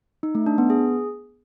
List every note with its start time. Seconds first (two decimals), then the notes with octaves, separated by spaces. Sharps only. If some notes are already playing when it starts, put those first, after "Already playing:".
0.23 D#4
0.35 A3
0.46 D4
0.58 B3
0.70 G#4